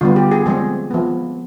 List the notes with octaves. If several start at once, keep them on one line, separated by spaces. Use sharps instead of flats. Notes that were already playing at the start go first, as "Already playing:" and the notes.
D3 G3 B3 F4
G4
G#4
F3 G#3 C4 G#4
F3 B3